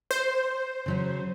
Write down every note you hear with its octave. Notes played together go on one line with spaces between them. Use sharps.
C5
C#3 F#3 C#4